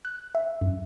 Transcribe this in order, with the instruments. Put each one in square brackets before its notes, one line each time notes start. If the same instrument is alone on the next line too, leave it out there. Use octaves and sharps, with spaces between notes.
[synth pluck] F#6
E5
F#2